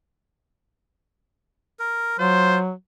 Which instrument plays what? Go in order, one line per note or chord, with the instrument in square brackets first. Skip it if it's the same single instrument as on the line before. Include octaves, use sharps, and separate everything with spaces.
[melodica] A#4
[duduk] F#3 [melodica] F4 [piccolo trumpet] C5